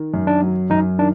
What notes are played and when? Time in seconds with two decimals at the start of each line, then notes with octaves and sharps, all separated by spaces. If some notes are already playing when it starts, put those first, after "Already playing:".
Already playing: D#3
0.14 F#2
0.27 D4
0.42 F#3
0.70 F#2 D#4
0.98 D#3 D4